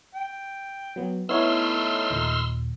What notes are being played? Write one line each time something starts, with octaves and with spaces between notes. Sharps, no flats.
G5
F#3 B3
A3 B3 D#4 E4 C#5 C6 E6 F6
D#2 A#2